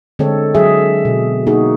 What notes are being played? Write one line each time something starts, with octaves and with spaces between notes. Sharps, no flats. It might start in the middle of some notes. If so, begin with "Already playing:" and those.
D3 G#3 C4 A4 C#5
F#3 G#4 E5
B2
A#3 D#4 F#4 G#4